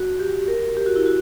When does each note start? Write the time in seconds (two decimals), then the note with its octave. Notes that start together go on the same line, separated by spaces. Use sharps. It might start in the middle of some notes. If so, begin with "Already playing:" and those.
Already playing: F#4
0.19 G4
0.48 A#4
0.77 G4
0.86 F#4
0.96 E4
1.06 F#4